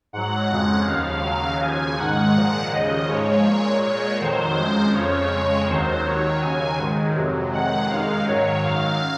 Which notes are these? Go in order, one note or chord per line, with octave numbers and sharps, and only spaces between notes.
G#2 F#3 F#5
F2 C#3 F3 G#3
D#2 C#3 F3 F5
D#2 C#3 F#3
D#2 C#3 F3 G#5
G#2 D#3 G#3 F#5
A#2 F3 G#3
D#2 C#3 F3 D#5
G#2 F3 G#3 C#5
A#2 G#3
A#2 G#3 C#5
F2 D#3 F#3 C5
F#2 F3 G#3
F2 C#3 F3 C#5
F2 C#3 G#3
D#2 D#3 F#3 C5
D#2 D#3 F#3 C#5
D#2 C#3 F#3 G#5
G#2 D#3 G#3
F2 C3 F#3
F2 C3 D#3 G#3 F#5
F#2 D#3 G#3 F5
G#2 D#3 F#3 C#5
F#2 D#3 F#3 F5